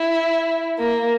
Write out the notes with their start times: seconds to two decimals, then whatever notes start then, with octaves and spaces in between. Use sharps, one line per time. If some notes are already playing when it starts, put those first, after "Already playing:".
Already playing: E4
0.79 A#3